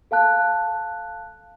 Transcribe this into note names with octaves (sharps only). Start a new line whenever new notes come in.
A4 F5 A5 F#6